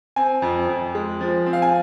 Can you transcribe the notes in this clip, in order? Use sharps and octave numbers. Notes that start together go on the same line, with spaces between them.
C4 G#5
F2
F2
G#3
F3
C4
F5
G#5